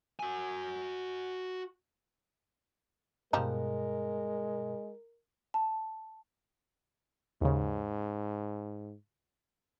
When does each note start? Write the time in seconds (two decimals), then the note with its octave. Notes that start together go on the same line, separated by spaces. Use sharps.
0.20 F#4 G#5
3.33 G2 B2 F3 G3 G#3 D#4 A#4
5.54 A5
7.41 D#2 G#2 C#3